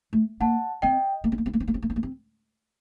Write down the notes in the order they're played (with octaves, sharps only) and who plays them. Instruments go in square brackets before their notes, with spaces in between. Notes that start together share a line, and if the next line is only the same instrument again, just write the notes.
[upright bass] A3
[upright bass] A#3 [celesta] F#5 A5
[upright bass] C4 [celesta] D#5 G5
[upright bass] A#3
C4
A#3
C4
A#3
C4
A#3
C4
A#3
C4
A#3
C4